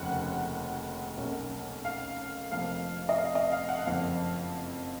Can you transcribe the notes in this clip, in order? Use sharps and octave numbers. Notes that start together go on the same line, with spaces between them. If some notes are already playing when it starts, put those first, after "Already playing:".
Already playing: F1 D#2 C#3 F3 F#5
B1 B2 A#3 C#4
F5
F1 F2 F3 A#3 F5
D#5
F5
D#5
F5
F#5
F#1 F2 F3 F5